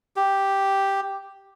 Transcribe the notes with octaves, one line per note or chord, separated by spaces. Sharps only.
G4